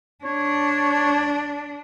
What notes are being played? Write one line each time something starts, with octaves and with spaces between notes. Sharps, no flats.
D4 C#5